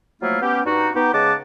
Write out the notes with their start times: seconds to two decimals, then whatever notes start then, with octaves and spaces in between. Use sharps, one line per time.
0.22 F3 F#3 A3 A#3 E4 F4
0.41 B3 C#4 G4
0.66 G2 D#4 F#4
0.95 B3 D#4 G4
1.13 C#3 G#3 D#5 F#5 A5 D6